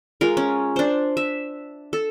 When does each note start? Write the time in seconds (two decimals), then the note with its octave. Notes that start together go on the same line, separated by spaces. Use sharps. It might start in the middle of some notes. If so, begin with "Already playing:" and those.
0.21 G#3 F4 A#4
0.37 C#4
0.76 D4 C5
1.17 E5
1.93 A4